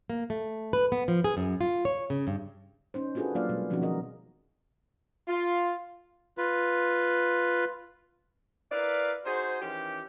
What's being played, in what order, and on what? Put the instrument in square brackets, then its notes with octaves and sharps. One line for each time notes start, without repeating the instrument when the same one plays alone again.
[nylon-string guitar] A#3
A3
B4
B3
F3
G#4
F#2
F4
C#5
C#3
G2
[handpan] C#4 D#4 C5
D4 F4 F#4 G#4 A4 B4
F#3 A#3 D4 F4 D5 F5
B2 G3 G#3 B4
B2 F3 C4 C#4 D#4 F#4
D#3 B3 C#4 G#4 A#4 D#5
[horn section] F4
[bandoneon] F4 B4
[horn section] E4 A#4 B4 D5 F5
D#4 F#4 G#4 C5
D#3 E3 C#4 G4